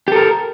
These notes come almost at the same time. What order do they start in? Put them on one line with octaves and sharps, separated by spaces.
G4 A4 A#4